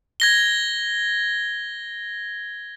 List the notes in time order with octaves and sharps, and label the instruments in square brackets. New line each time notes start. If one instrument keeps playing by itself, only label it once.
[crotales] G#6 A#6 G7